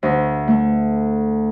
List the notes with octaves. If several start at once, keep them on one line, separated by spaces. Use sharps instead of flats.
D2
A3